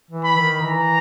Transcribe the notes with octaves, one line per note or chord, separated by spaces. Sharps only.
E3
B5
D#3
E3 A#5